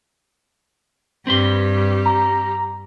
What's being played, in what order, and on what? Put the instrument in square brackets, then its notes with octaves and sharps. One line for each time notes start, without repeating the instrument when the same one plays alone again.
[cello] G2 [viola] G3 G4 [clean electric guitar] C4 B4 C6
[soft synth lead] A#5